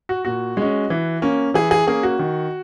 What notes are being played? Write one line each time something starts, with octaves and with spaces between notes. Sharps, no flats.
F#4
A#2 F#4
G#3 C#4
E3
A#3 C#4
E3 G#4
G#4
A#3 C#4 G#4
F#4
D#3